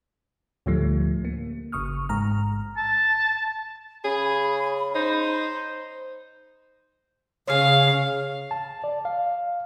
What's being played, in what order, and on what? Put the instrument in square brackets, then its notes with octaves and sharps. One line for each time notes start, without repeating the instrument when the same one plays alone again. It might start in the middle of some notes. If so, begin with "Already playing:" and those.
[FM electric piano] D2 A2 D3 F3 G3 A3
A#3
G1 C#3 C#6 D#6 F6
A1 G#2 A#5 F6
[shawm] A5
[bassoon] C#3 [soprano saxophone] G#4 [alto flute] B5
[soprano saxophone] D#4 [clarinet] C5
[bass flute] C#3 [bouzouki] G#4 C#5 [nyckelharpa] F5
[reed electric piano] A5
D5
F5